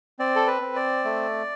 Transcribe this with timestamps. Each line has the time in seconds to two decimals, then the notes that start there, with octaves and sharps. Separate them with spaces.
0.19 C4 D5
0.36 A4
0.47 B4
0.62 C4
0.76 D5
1.04 A3